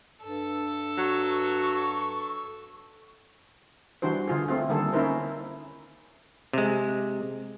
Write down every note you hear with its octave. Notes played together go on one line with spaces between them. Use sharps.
G2 A4
F#3 C#6
E3 G3 D4 F#4 C5
D3 F4 G#4
A3 C4 F4
D3 D#3 G3 A#3 G#4 A4
A#3 C#4 D#4 E4 A#4 C5
C3 G#3